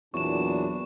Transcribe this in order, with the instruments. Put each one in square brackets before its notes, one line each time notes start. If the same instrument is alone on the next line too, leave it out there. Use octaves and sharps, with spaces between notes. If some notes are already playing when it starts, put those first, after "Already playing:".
[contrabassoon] E2 [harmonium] A#2 D4 [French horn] F#3 [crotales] C#6 E7